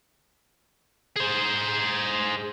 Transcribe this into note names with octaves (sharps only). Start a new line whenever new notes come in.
G#4 C5